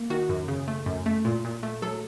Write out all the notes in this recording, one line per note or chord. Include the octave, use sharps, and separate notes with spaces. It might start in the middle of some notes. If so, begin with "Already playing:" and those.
Already playing: A#3
D#3 F#4
F#2
C#3
A3
F#2
A3
A#2
A#2
A3
F#3 A4